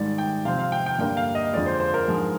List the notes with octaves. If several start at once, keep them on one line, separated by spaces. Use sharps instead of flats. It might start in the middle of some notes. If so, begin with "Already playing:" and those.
Already playing: G#2 D#3 G3 D5
G5
C3 F3 C4 F5
F5
G5
G5
G2 D3 G3 A#3 G5
F5
D#5
F2 D3 G#3 D5
C5
C5
A#4
G#2 F3 G#3 D4